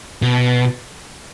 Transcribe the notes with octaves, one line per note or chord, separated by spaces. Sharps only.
B2